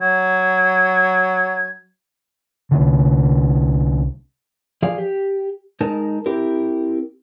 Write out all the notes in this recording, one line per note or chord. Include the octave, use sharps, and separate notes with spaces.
F#3 G#6
C2 D3
F3 G#4 D5 F5
G4
G#3 D#4 A#4 A5
C4 E4 G4 A#4